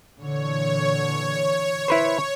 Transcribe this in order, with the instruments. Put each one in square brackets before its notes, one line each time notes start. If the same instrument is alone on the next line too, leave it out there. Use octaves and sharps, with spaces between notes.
[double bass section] A#2 D3 E3 [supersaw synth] C#5
[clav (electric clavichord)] E4 B4 C5